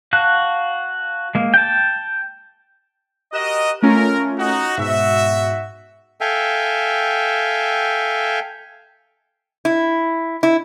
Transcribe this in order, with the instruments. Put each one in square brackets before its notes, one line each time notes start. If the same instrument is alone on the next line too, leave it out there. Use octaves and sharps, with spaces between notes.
[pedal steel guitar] F#4 F5 A5 F#6
G#3 A#3
G5 A5
[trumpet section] F#4 A#4 D#5 [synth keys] G4 F#6 E7
[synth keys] A3 C#4 F4 [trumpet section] A#4
[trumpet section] D#4 F#4
[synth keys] G#2 B2 [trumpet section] F#4 E5
[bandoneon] A4 E5 F5 G5 G#5
[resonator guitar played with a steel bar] E4
E4